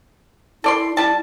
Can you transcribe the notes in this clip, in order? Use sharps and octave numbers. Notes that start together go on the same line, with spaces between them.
E4 A4 D5 C6
G3 E4 A5